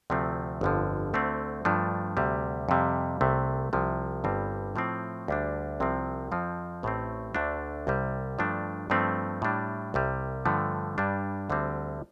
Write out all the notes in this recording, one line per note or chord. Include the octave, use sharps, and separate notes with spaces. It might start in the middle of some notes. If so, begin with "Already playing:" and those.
D2 C3 F3 A3 C4
G1 F2 D3 F3
D2 D3 A3 C4
G2 F3 A3 D4
D2 C3 G3
F2 C3 G3
C2 C3 A3
C2 C3 F3
G1 G2 D3 G3 C4
A2 F3 A3 C4
D2 D3 G3 D4
C2 C3 F3 C4
F2 F3 C4
A1 A2 A3 C4
D2 D3 A3 D4
C2 C3 G3
G2 F3 A3 D4
G2 F3 A3 C4
A2 G3 D4
C2 C3 G3
G2 D3 F3 A3
G2 G3 D4
D2 D3 G3 C4